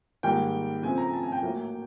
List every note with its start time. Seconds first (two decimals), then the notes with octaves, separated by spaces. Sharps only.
0.23 G#2 D#3 G3 A#3 G5
0.83 C#3 F3 A3 C4 G#5
0.98 A#5
1.13 A5
1.23 G#5
1.32 G5
1.43 A2 F#3 A#3